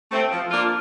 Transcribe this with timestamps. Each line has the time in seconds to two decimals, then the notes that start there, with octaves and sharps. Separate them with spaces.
0.11 A3 C4
0.31 F3
0.51 A#3 D4 F4